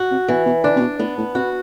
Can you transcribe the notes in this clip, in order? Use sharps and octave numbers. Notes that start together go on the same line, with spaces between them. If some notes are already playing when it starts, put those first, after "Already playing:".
Already playing: F#4
C3
B2 E3
B2
D3 D4
C3
B2
A2 B3
A2
C3 F#4